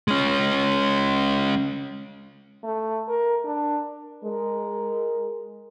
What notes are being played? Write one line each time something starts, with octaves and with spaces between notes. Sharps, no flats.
G#3 C#4
A3
A#4
D4
G#3 A#4